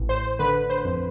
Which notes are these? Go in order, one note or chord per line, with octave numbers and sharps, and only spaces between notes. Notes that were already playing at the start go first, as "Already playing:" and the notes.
Already playing: A1 E3
C5
D3 B4
C5
F2